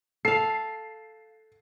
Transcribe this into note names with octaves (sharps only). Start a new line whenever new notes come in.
A4 F5 C7